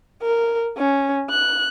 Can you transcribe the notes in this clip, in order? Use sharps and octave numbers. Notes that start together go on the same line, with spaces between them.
A#4
C#4
F#6